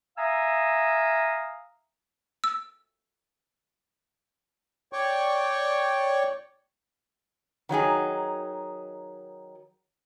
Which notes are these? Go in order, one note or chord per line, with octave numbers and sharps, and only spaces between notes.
E5 F5 G#5 A#5 D#6 E6
E6
C#5 D5 G5 C#6
D#3 F#3 D#4 G#4